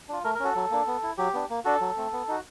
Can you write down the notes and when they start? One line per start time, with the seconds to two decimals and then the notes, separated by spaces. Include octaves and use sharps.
0.09 D4 F4
0.24 A3 A#4
0.35 A#4
0.40 C#4 F#4 A4
0.56 F#3
0.71 A#3 D4
0.87 B3
1.03 E4
1.18 F#3 G4
1.34 B3 D4
1.50 A#3
1.65 D4 F#4 A4
1.81 F#3
1.97 A3 C4
2.13 B3
2.28 D#4 F#4